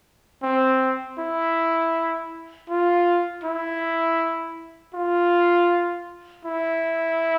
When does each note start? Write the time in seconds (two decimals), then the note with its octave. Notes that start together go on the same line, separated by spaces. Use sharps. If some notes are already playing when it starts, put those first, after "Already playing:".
0.43 C4
1.19 E4
2.70 F4
3.44 E4
4.94 F4
6.45 E4